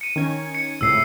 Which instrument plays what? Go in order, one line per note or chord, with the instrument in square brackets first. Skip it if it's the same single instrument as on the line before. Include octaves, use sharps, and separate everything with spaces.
[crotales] C#7 D#7
[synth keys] D#3 C#4 G#6
[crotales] C#7
[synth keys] C#2 A2 C3 [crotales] E6 C7